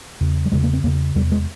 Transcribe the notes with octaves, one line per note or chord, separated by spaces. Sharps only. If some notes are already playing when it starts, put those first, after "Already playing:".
E2 C#3
G3
E2 C#3 G#3
A#3
C4
E2 C#3 A#3
E2 C3 G3
G#3